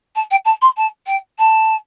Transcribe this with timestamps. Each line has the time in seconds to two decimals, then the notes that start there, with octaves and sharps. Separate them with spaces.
0.15 A5
0.31 G5
0.45 A5
0.62 C6
0.77 A5
1.06 G5
1.38 A5